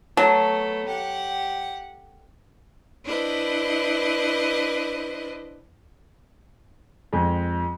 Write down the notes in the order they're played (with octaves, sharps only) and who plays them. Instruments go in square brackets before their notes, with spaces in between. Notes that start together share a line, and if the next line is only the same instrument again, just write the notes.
[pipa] F#3 [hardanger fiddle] A3 B3 [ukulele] A5
[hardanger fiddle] G4 F#5
[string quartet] D4 E4 B4 C5 D#5
[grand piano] F2 G#3